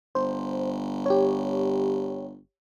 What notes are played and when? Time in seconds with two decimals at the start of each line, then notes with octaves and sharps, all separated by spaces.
0.15 G1 C5
1.06 G4 C#5